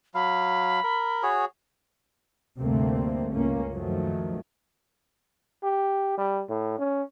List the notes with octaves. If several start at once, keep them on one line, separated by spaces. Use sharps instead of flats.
F#3 F5 B5
A#4
F#4 G#4 C#5
D2 G2 C3 A3 A#3 C4
C#2 A#3 C#4
F#2 D#3 F3 F#3 A3
G4
G3
A2
C#4